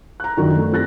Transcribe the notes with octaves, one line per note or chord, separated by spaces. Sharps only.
A#5 F#6
F#2 D#3 F3 D4
A3
F3 C4 G4 F#6 A6 A#6